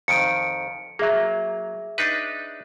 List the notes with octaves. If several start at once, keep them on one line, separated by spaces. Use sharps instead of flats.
F2 D#3 C#7 D7
F#3 A#3 G#4 E5
D4 D#4 B4